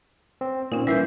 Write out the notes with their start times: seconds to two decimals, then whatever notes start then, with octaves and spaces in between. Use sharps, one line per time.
0.41 C4
0.72 A#2 C#4 D#4
0.87 E3 G3 A#4 E5 G6 C7